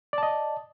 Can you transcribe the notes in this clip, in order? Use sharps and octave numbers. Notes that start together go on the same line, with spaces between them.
D5 D#5 A5